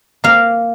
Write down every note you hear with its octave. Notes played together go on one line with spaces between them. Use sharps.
A#3 F5